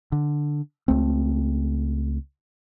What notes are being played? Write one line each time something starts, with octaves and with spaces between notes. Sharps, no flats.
D3
C#2 A3 C4